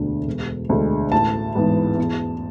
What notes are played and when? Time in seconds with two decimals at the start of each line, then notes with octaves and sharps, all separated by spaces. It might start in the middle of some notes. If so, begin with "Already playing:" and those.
Already playing: E1 D2 D3
0.27 E1
0.69 D2 D3 G#3
1.12 A1 A5
1.55 G#2 E3 B3
1.98 E2